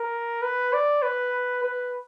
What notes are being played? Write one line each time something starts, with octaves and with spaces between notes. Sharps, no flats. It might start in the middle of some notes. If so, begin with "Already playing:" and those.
Already playing: A#4
B4
D5
B4
B4